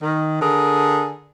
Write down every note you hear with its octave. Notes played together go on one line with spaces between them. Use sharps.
D#3
D3 G#4 A#4